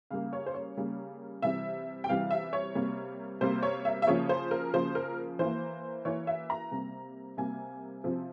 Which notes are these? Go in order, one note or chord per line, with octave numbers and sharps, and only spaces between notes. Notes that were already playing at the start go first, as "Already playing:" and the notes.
C#3 G3 A#3 F5
C#5
C5
C#5
C#3 G3 A#3
C3 E3 G3 E5
G5
C3 E3 G3 F5
E5
C#5
C3 G3 A#3
C3 G3 A#3 C5
C#5
E5
E5
C#3 F3 A#3 C#5
C5
A#4
C#3 F3 A#3 C5
A#4
E3 A#3 C5
E3 A#3 C#5
E5
A#5
C3 G3 A#3
C3 G3 A#3 G#5
C3 F3 C4